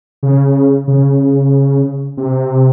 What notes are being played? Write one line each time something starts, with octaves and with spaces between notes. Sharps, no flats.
C#3
C#3
C3